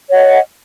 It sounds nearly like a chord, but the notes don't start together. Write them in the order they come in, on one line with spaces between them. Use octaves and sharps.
C#5 F#5 D#5